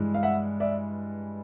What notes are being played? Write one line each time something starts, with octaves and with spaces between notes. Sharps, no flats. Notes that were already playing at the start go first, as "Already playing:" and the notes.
Already playing: G2 E3 G#3
F5
E5 F#5
D5 E5